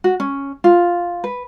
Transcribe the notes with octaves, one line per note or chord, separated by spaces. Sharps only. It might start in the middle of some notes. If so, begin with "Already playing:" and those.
F#4
C#4
F4
B4